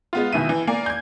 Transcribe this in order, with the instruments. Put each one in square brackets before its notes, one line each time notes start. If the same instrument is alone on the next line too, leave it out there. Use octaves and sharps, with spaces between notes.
[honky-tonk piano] G#3 B3 F4
B2 D#3 E3 E5 D#7
E3
A#3 D5 G#5
G6 G#6